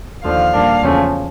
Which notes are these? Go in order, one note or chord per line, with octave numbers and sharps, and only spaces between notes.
D#2 D3 F3 F5
A#2 G3 A#3 D4
E2 C#3 F3 A3 C#4